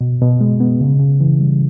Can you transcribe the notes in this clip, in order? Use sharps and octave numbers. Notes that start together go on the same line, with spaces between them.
B2
B2
G#3
B3
C#3
C#3
E3
G3